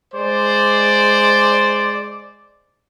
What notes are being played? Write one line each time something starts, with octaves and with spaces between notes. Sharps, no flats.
G#3 C5 D5